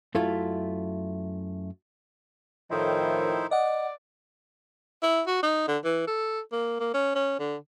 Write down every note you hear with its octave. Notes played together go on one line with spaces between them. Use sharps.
F#2 A3 E4 F4
A2 D#3 F3 D#4 E4 C5
D5 D#5 F#5
E4
F#4
D#4
D3
E3
A4
A#3
A#3
C#4
C#4
D3